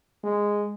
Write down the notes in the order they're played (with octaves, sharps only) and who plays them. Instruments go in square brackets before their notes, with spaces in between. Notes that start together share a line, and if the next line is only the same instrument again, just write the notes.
[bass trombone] G#3